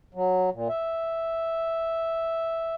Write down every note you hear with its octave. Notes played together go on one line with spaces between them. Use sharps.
F#3
A#2
E5